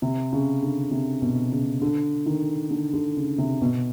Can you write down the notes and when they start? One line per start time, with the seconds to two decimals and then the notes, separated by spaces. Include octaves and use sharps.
0.02 C3
0.33 C#3
0.62 D3
0.91 C3
1.22 B2
1.52 C#3
1.82 D3
2.26 D#3
2.71 D3
2.94 D3
3.17 C#3
3.38 C3
3.61 B2